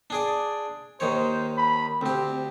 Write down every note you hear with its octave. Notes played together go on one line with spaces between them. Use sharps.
D4 G#4 D5
D#2 D#3 C5 C#5
B5
D2 C4 G4